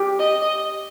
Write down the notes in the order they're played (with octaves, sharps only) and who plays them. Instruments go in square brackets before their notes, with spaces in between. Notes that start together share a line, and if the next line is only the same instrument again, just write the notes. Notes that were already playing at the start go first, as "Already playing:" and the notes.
Already playing: [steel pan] G4
[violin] D#5